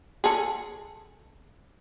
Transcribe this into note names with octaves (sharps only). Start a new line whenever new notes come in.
G#4 A4